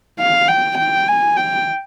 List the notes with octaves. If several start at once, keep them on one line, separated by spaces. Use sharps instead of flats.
F5
G5
G5
G#5
G5